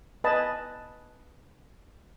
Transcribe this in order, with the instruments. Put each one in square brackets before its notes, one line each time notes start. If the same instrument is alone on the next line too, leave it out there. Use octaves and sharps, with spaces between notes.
[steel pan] B4 D#5 G#5 A5 B5